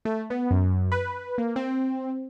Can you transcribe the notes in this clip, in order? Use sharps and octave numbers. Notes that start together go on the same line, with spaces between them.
A3
B3
F#2
B4
A#3
C4